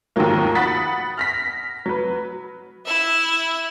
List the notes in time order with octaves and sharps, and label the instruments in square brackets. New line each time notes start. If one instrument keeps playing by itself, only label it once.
[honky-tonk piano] D#2 G#2 D#3 F3 F#3 A#3
F#5 B5 D#6 A6 B6
F6 A#6 B6
F#3 B4
[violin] E4 E5